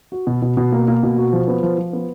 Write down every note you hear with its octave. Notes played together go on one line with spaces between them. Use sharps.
F#4
B2
B2
B2
A#3
A#3
B2
F#4
F3
B3
F3
F3
B3